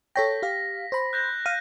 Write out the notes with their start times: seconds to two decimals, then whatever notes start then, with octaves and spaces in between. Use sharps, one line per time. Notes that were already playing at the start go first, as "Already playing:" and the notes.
0.16 A4 C#5 G5 A#6 B6
0.42 G4 F5
0.92 C5 B5
1.13 F#6 G6 A#6
1.46 F5 D#7